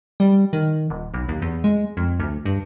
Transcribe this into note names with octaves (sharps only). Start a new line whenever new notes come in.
G3
D#3
D#1
B1
D#2
E2
G#3
F2
D2
G2